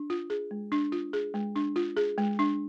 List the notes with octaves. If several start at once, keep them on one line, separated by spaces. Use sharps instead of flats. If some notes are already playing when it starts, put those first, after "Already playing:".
Already playing: D4
F4
G#4
G#3
D4
F4
G#4
G#3
D4
F4
G#4
G#3
D4